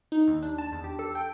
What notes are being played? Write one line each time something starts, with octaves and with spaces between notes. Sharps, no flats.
D#4
D#2
D4
A5
E2
G4
A4
G5